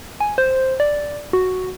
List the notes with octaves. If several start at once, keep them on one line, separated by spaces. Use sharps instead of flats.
G#5
C5
D5
F#4